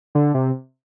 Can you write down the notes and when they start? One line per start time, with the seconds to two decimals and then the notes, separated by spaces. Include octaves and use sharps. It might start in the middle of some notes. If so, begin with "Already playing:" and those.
0.15 D3
0.34 C3